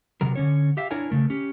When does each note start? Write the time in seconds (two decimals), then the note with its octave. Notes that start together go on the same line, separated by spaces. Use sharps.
0.21 C3 F#3 A#4
0.36 D3 C#4 C#5
0.77 G4 E5 F5
0.91 D4 E4 A#4 C#5 G#5
1.10 C#3 A3 A#4
1.30 C#4 G4